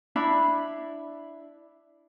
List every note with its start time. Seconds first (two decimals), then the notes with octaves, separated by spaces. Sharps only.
0.16 D4 E4 B5